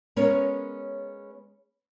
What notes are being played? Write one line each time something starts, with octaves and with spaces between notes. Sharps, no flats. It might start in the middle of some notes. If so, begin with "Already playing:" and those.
G#3 B3 C#4 A#4 C#5